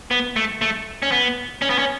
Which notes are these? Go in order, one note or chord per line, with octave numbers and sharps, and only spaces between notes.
B3
A3
A3
C#4
B3
C#4
B3
C#4